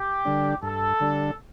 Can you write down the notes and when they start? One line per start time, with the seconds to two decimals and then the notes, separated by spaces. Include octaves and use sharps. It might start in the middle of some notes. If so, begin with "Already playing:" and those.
Already playing: G4
0.25 D3 G3 D4
0.63 G2 A4
1.00 D3 G3 D4